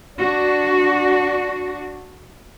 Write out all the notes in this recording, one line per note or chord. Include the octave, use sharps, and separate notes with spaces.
D4 F#4